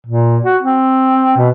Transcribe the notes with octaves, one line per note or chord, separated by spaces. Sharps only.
A#2
F#4
C4
B2